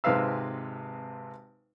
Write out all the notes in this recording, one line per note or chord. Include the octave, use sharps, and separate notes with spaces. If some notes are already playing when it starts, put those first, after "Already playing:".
G#1 C3 G#3 B4 F5 E6